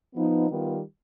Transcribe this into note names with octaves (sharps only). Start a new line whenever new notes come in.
F3 B3 D#4
D#3 G3 B3 F4